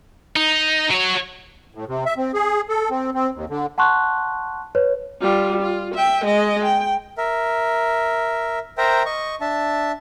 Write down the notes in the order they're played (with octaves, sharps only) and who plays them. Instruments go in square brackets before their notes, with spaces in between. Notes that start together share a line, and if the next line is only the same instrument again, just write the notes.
[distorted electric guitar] D#4
F#3 C#5
[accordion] A2
C3
E5
C4
G#4
A4
C4
C4
D#2
D3
[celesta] F#5 A5 C6 C#6 F#6
B4 C#5
[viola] G3 F4
F4
E5 G5
G#3 D#5
G5
[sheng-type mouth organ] A#4 E5
A#4 C5 E5 G5 A#5
D#5 C#6
D4 E5 A5